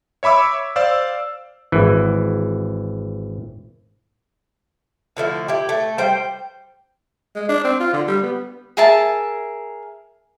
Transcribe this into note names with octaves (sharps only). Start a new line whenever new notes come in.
C#5 E5 B5 D6 E6
C5 D5 F5 E6
G#1 E3
D3 F3 A3 E4
E4 G4
A3
G3 C5 G5
G#3
D4
C4
F4
D3
G3
B3
G#4 A#4 E5 A5